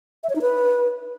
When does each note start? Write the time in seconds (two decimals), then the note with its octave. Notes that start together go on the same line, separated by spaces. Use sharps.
0.24 E5
0.30 C#5
0.36 D#4
0.42 B4